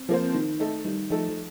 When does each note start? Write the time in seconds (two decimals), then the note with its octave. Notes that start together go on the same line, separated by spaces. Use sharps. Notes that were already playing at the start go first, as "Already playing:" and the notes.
Already playing: C4
0.09 F3 A#3 F4 C5
0.34 D#3
0.60 A3 D#4 A4
0.85 D#3 G3
1.10 F3 A3 D#4 A4
1.29 F3